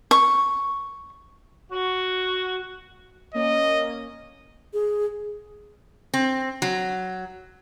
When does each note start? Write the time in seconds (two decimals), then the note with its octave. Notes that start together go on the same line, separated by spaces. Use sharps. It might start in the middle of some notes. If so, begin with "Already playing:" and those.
0.11 C#6
1.72 F#4
3.35 A#3 C#4 D#5
4.73 G#4
6.14 C4
6.62 F#3